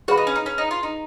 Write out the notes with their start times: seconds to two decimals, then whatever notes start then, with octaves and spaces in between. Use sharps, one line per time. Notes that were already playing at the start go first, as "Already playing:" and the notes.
0.08 F#4 G#4 B4 F5 B5
0.18 D#4
0.27 C#4
0.36 D#4
0.46 C#4
0.58 D#4
0.71 F4
0.83 D#4